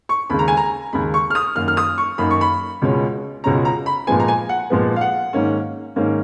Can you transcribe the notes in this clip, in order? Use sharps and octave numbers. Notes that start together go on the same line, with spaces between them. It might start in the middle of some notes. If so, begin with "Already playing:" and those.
C#6
D#2 C#3 G#3 B5
A#5
G#5
A#5
D#2 C#3 G#3 B5
C#6
F6
D#6
F#2 D#3 A#3 D#4 F6
F6
D#6
C#6
F#2 D#3 A#3 D#4 B5
C#6
B5
C#2 B2 G#3 C#4
C#2 B2 G#3 C#4 A#5
A#5
B5
A#2 F3 G#3 B3 G#5
A#5
G#5
F#5
A#2 F3 G#3 B3
F5
F#5
G#2 D#3 A#3 C#4
G#2 D#3 A#3 C#4